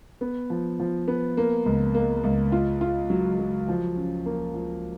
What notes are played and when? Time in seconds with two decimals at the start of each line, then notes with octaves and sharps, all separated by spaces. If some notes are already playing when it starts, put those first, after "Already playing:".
0.21 B3
0.50 F3
0.80 F3
1.08 B3
1.37 A#3
1.66 C#2
1.95 A#3
2.24 C#2
2.52 F4
2.81 F4
3.10 F#3
3.39 F#3
3.68 F3
3.97 C#4
4.26 A#3
4.54 F3